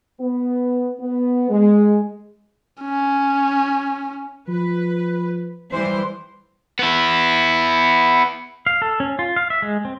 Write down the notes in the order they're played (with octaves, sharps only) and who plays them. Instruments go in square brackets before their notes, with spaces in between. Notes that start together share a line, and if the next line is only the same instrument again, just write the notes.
[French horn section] B3
B3
G#3
[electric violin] C#4
[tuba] F3 [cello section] B4
[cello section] E3 G3 C5
[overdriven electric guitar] B3 E4
[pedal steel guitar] F5
A4
C#4
F4
F5
E5
G#3
C4